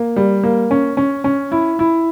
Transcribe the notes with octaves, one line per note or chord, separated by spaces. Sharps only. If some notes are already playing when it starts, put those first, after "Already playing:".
Already playing: A#3
G3
A#3
C#4
C#4
C#4
E4
E4